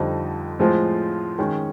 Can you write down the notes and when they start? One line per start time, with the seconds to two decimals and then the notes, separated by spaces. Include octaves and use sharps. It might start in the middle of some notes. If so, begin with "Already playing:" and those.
Already playing: F2 D3 G3 C4 D#4
0.59 A2 F3 G#3 C4 F4
1.39 D#3 G#3 C#4